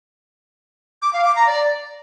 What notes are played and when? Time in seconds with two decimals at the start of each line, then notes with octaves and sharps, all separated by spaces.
1.02 D6
1.13 F5
1.25 D6
1.36 A#5
1.47 D5